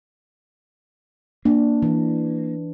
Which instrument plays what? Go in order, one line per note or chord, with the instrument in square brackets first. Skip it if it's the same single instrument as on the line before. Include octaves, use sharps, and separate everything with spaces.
[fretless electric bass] A#3 [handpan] D4
[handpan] E3